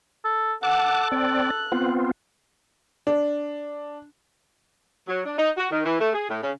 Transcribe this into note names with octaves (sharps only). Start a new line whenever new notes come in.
A4
A4 F#5 A5 D6 F#6
C4 D5 F#6
B3 C4 F4
D4
F#3
D4
D#4
F#4
D#3
E3
A3
G#4
A2
C#3